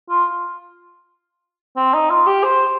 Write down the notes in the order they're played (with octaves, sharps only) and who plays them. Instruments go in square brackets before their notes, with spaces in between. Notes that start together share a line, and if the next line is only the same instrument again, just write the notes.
[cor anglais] F4
C4
D#4
F4
G4
C5